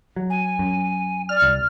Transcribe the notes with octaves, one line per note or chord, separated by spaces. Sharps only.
F#3
G#5
F#2
D5 F6
C2